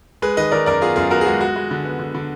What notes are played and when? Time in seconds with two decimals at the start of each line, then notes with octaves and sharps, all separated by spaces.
0.22 G#3 G#4 B4
0.37 D#3 B4 D#5
0.51 D#3 A#4 D5
0.66 F#2 A#4 D5
0.81 B3 F4 G#4
0.96 F#2 F4 G#4
1.10 B3 F#4 A#4
1.21 G#4
1.26 G#3 F#4
1.41 G#3 F#4
1.56 G#3
1.71 D3
1.85 B3
1.99 D3
2.15 D3